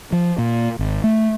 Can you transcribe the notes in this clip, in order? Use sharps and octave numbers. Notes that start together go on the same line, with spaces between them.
F3
A#2
G#1
A3